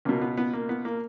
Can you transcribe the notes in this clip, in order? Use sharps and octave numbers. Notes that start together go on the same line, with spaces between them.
C#2 B2 A#3
B3
B3
A#3
B3
A#3